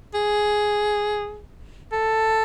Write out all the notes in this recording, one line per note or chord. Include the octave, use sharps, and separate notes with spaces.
G#4
A4